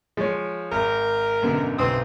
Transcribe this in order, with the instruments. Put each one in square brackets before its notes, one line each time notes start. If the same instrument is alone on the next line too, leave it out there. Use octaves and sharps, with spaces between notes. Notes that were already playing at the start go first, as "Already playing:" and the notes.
[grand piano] F3 C#5 [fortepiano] G#3
[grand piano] G#1 [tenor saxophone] A#4
[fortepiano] F#2 B2 D3
[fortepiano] B1 D#6 [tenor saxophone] C4